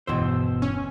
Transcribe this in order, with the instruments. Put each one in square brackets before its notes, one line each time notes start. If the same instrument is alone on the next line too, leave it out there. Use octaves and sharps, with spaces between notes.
[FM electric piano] G1 E2 E6 [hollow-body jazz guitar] B2 C5
[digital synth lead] C#4